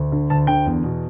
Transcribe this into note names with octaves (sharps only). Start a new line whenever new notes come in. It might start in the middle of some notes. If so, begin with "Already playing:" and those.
Already playing: D2
D3
D2 A5
D3 G5
E2
B2